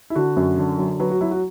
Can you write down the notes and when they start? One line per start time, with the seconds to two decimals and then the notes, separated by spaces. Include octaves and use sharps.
0.10 E4
0.16 D3 F#4
0.37 F#2
0.58 D3
0.78 F#3
1.00 F#3 B4
1.10 F#4
1.21 F#3 E4
1.31 F#4